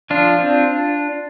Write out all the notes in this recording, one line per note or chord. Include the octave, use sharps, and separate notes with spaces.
F3 D4 F4
C4